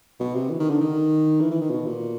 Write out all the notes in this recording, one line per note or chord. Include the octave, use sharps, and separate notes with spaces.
B2
C3
E3
D#3
D3
D#3
E3
E3
D#3
B2
A#2